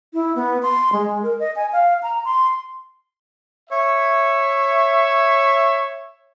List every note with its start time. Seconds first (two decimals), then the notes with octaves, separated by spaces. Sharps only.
0.14 E4
0.36 B3
0.63 C6
0.93 G#3
1.23 A#4
1.40 D#5
1.56 G#5
1.73 F5
2.03 A#5
2.25 C6
3.69 C#5 E5